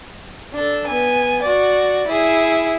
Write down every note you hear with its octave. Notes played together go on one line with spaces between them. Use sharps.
D4 A4
B3 G#5
F#4 D5
E4 G#4